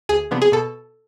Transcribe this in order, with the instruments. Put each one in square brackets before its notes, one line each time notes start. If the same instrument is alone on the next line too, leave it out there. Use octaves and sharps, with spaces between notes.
[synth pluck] D2 G#4
C3 F3 B3 D4
G#4
B2 A4